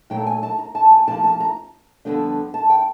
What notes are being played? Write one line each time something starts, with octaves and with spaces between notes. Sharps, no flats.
A#2 F#3 A3 G5
G#5
A5
A#5
A5
G#5
C3 F3 A#3 A5
A5
A#5
F2 D3 G3 B3 D4
A5
G5